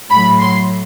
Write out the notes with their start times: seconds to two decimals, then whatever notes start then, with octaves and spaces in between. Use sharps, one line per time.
0.11 A2 F#3 B5
0.41 C6